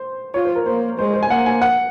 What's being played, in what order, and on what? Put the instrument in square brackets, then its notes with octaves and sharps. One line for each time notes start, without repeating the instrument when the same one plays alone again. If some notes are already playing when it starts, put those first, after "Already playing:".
Already playing: [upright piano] C5
[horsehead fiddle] F4 [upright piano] C#5
[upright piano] C5
A#4
[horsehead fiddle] A#3 [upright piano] C5
[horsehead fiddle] G#3 [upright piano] C5
[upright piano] C5
G#5
[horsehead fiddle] A#3 [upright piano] F#5
[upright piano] G#5
F#5